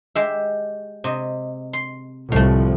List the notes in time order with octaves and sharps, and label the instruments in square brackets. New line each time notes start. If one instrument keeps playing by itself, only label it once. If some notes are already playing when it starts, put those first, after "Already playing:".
[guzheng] G#3 G4 E5
C3 D#5
C6
[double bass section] C2 F3 [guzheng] A2 A3